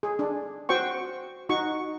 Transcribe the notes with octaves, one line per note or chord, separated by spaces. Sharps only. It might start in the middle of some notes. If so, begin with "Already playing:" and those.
G#4
D4
F#4 C5 G5 C#6
D#4 F#4 C#6